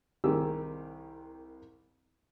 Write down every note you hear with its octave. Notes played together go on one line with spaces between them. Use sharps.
C2 D#3 C4 G4 G#4 E6